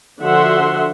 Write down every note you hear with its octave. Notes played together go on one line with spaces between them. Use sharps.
D3 F3 F#4 E5 F#5 C6